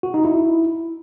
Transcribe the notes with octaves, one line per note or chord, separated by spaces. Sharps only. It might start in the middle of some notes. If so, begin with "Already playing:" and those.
F#4
D#4
E4